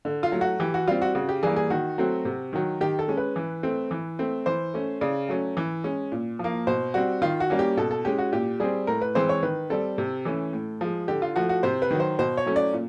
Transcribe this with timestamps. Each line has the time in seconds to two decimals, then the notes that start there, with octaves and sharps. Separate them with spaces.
0.05 D3
0.23 F4
0.32 F#3 A3
0.41 F#4
0.60 E3 G4
0.74 F#4
0.87 G3 C4 F4
1.02 F#4
1.15 C#3 F#4
1.29 G4
1.43 E3 G3 A#3 G#4
1.56 G#4
1.70 D#3 F#4
1.98 F#3 A3 C4
2.25 C3
2.53 D#3 F#3
2.81 D#3 G4
2.99 A4
3.08 G#3 C#4
3.17 B4
3.36 E3
3.63 A3 C4
3.91 E3
4.19 A3 C4
4.46 E3 C5
4.74 A3 C#4
5.01 C#3 D5
5.29 F#3 A3 C#4
5.57 E3
5.84 G#3 C#4
6.12 A#2
6.39 F3 A#3
6.67 B2 C5
6.94 G3 C4 F#4
7.22 D#3 F4
7.40 F#4
7.50 G3 A#3 C#4
7.59 G4
7.77 B2 A4
7.91 A4
8.05 G#3 C#4 G4
8.18 F#4
8.32 A#2 G4
8.60 G3 C4 G#4
8.87 A2 A#4
9.01 B4
9.15 E3 G#3 C4 C5
9.29 C#5
9.43 D#3 B4
9.70 G3 C4 A4
9.98 C3
10.25 E3 A3 C#4
10.53 A2
10.81 F3 G#3
11.08 D3 G4
11.22 F4
11.36 F3 A3 F#4
11.49 F#4
11.63 C3 C5
11.82 B4
11.91 D#3 F#3
12.00 C5
12.19 B2 C5
12.37 C#5
12.46 F#3 A3 C#4
12.56 D5
12.73 A#2